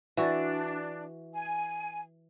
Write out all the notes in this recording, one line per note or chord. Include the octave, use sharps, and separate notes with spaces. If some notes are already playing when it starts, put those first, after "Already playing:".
E3 D4 F#4
G#5